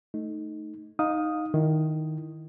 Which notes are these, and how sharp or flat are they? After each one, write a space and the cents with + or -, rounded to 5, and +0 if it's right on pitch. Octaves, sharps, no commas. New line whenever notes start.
A3 +0 D#4 +0
D#4 +0 F5 +25 D#6 +0
D#3 +0 E4 +0